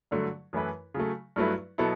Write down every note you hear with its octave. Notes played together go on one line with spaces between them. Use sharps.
G2 D3 F#3 A3
F#2 E3 A3 E4 B4
C#3 F#3 A3
G2 F#3 A3 E4 B4
B2 F#3 B3 E4 A4